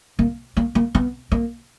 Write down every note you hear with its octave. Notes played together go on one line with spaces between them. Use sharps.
A#3
A#3
A#3
B3
A#3